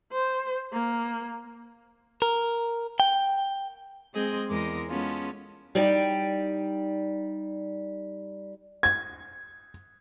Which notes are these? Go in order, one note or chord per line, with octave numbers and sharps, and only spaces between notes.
C5
A#3
A#4
G5
G#3 C4 G#4 D#5 G6
E2 G#3 A#4 C6 D6 A#6
G#3 B3 C#4 F4 A4
G3 D#4 D5 G5
G#6